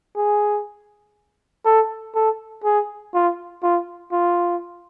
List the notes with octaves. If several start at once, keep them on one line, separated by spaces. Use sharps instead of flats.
G#4
A4
A4
G#4
F4
F4
F4